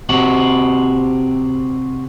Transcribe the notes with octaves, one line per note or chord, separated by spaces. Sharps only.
C3 C4 F#4